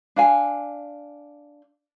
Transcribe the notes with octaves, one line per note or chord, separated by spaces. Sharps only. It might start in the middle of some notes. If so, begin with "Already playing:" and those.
D4 F5 G#5